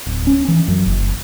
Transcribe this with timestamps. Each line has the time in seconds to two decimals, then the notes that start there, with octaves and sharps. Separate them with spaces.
0.06 D1
0.27 C#4
0.48 E3
0.68 F#2
0.86 F#1